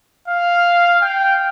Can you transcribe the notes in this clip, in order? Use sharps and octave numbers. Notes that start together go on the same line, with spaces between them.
F5
G5